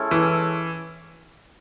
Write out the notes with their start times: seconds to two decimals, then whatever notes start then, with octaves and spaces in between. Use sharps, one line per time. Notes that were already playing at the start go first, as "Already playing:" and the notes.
Already playing: G#3 C#4 E4 A4
0.11 E3